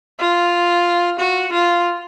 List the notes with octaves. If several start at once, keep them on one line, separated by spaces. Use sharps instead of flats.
F4
F#4
F4